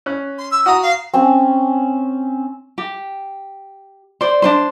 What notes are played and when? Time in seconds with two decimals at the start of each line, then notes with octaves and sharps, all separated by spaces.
0.06 C#4 F#6
0.38 C6
0.51 E6
0.66 F#4 A#5 D#6
0.82 F5
1.14 C4 C#4
2.78 G4
4.21 C5 D5
4.42 D4 D#4 C5